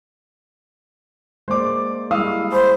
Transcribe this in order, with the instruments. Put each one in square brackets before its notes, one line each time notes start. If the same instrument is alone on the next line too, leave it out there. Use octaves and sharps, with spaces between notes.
[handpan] G#3 A#3 D5 [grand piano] C5 D6
[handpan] G3 G#3 E4 [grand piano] F5 D#6 E6
[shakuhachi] C5 [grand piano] B5